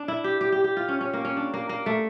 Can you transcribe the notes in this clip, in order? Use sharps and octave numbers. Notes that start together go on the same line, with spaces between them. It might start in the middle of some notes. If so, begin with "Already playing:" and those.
Already playing: D4
E4
G4
G4
G4
G4
F4
C#4
C#4
A#3
C#4
D4
A#3
A#3
A3